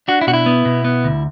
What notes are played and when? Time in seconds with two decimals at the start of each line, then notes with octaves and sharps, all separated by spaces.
0.08 D4 F#4
0.21 E4
0.27 B2 F#4
0.34 E4
0.46 B3
0.65 B2
0.85 B3
1.04 D2